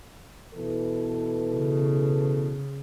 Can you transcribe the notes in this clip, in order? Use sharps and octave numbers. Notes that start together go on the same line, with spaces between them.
B2 E3 A4
C#3